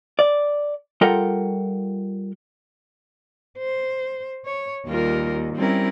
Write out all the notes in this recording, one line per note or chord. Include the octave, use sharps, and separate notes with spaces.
D5
G3 F4 A4 A#4 F#5 G5
C5
C#5
D#2 G3 F4 A#4
G3 C4 C#4 E4 A#4